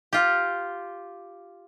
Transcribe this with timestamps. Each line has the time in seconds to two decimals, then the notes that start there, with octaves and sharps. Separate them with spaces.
0.13 F4 G4